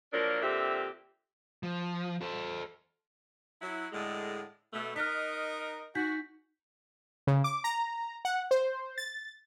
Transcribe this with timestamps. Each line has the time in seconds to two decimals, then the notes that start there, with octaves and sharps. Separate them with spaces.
0.13 F3 F#3 A#3 D4 A#4
0.42 A#2 D3 C4 G4 E5
1.63 F3
2.21 A4 C5
3.62 F#3 E4
3.92 A2 D3 G#3
4.73 B2 A3
4.96 D#4 A#4 D#5 F6 F#6 B6
5.95 D#4 F#4 G6 B6
7.27 C#3
7.44 D6
7.64 A#5
8.25 F#5
8.51 C5
8.98 A6